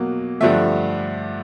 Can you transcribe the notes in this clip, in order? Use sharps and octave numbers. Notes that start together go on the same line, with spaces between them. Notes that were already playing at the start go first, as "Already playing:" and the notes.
Already playing: B2 F#3 A#3
G2 D3 F3 A3 E5